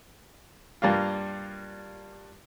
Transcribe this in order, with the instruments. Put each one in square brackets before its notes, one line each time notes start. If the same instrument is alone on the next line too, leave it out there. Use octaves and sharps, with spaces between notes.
[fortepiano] G2 G3 A#3 F4